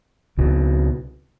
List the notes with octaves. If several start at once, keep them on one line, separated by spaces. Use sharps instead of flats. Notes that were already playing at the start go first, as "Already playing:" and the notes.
C#2 B2